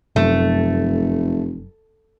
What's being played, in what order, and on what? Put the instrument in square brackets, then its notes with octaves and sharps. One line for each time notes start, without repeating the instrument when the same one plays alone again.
[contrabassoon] F1 [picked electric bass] F#2 C3 [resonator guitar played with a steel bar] A3